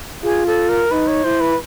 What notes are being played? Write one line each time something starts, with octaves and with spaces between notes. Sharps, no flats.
F4 G#4
A4
A#4
D#4 B4
C#5
E4 C5
B4